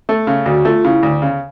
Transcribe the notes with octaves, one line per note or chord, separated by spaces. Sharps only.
A3
C#3
D2 F#4
A3 F4
C#3 E4
D2
C#3